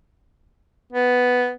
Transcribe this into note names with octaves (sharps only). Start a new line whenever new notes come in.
B3